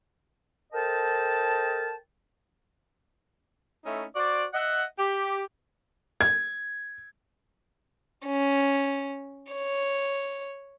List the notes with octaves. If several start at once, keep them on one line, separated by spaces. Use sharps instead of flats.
A4 A#4 C5 D#5 G5 A5
A3 C#4 D#4 E4
F#4 C5 D5
D#5 E5 F#5
G4
G#6
C#4
C#5